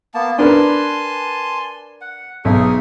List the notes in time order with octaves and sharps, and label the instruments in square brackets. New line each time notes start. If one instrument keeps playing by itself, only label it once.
[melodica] A#3 B3 A5
[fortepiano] D4 A#4 B4 [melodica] G#5 A5 C6
[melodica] F#5
[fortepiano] B1 [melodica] D#4 G#4 E5